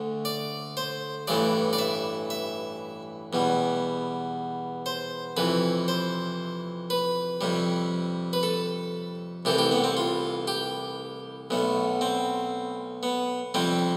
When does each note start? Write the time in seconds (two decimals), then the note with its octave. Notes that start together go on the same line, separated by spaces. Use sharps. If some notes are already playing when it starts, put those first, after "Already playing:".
Already playing: D2 D3 A3
0.25 D5
0.77 C5
1.27 A1 G2 E3 A3 D5
1.73 D5
1.78 E5
2.30 E5
3.33 E2 B2 G3
4.86 C5
5.37 F2 C3 E3 B4
5.88 C5
6.90 B4
7.41 F2 C3 G3
8.33 B4
8.43 A4
9.45 C2 C3 E3 A3 G4
9.58 G4
9.71 B3
9.84 C4
9.97 F4
10.48 G4
11.50 B1 B2 A3
12.01 C4
13.03 B3
13.54 F2 C3 G3 C4